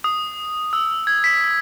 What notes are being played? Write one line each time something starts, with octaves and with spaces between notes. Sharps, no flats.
D#6
E6
G#6
B6